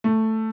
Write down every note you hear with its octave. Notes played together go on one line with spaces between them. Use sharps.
A3